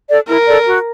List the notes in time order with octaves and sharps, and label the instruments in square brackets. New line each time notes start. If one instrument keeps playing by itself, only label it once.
[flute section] A4 D5
[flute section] E4 [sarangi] A#4
[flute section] A4 D5
F#4